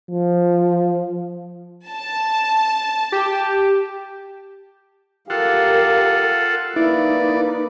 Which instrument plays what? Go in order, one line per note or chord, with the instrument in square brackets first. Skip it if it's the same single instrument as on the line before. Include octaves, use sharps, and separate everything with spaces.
[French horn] F3
[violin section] A5
[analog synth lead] G4
[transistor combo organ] F4 A4 F#5 [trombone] G4 [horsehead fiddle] A#4 F5
[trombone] A#3 [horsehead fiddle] D#4 B4 [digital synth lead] E4 [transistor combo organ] D5